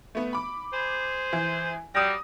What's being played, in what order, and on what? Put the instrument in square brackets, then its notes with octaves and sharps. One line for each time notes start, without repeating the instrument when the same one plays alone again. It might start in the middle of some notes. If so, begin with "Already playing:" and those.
[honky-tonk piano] A3 B3
B5 D6
[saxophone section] G#4 C5
[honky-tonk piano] E3
[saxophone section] F#3 G3 [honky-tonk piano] D#6 A#6